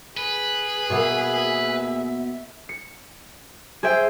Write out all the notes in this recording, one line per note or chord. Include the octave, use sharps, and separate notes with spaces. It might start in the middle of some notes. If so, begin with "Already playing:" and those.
G#4 B4
B2 A#3 B3 E5
C#7
G#4 C5 E5 G5